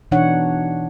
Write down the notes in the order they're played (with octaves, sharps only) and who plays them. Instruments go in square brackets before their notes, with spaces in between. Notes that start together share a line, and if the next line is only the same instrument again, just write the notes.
[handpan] B2 E3 D4 D#4 C#5 F#5